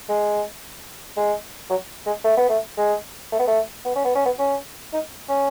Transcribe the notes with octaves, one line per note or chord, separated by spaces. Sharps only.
G#3
G#3
F#3
G#3
A3
B3
A3
G#3
A3
B3
A3
B3
C#4
B3
C#4
B3
C#4
D#4
C#4